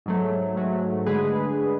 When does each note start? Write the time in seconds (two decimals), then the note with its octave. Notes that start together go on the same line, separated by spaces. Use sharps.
0.06 G#2 F#3 A3
0.56 G#2 F#3 A3
1.06 D3 G#3 G#4 B4